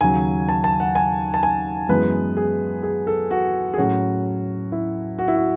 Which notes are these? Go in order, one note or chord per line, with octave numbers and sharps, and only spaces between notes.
D#2 C#3 F#3 G#5
A5
A5
F#5
G#5
A5
G#5
F#2 E3 G#3 B3 B4
G#4
G#4
A4
F#4
G#4
A2 F#3 C#4 F#4
E4
F#4
E4
F#4